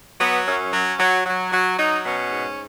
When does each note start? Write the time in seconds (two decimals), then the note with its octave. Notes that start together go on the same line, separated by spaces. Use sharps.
0.20 F#3 B3
0.47 F#2 C#4
0.73 F#3
0.99 F#3
1.26 F#3
1.52 F#3
1.78 F#3 D#4
2.05 B2 C#4
2.31 G#2